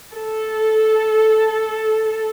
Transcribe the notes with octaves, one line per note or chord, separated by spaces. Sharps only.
A4